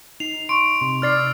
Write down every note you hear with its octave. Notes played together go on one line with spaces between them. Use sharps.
D#4 C7 F7
C6 C#6 D7
C3 C6
D#4 D5 F6 A6 C7
E6